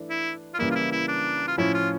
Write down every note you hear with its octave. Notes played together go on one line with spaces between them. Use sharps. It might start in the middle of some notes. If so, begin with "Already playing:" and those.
Already playing: E3 A3 D4
E4
F4
C#3 E3 G3 A#3 E4
F4
E4
E4
D4
F4
A2 F3 C#4 E4
F4